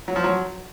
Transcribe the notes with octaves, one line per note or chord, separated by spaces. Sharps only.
F#3
F3
F#3